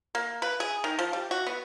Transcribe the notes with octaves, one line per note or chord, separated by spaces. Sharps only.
A#3
B4
G#4
D#3
F3
G3
F#4
B3